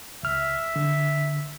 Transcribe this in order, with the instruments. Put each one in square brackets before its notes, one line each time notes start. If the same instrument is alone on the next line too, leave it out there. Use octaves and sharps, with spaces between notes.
[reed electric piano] C#2 F6 [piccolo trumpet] E5
[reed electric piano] D3